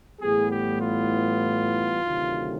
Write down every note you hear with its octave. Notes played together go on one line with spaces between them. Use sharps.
A2 E3 G3 B3 G#4
G4
F4
D2 C3 D#3 F#3 A3